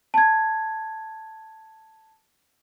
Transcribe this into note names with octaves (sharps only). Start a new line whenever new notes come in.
A5 G#6